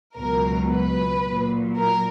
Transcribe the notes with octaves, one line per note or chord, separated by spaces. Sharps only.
C#2 B2 F#3 A#4
B4
A#2 F#3
A#4